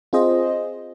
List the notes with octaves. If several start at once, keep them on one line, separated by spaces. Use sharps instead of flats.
C4 F4 G#4 C5 D#5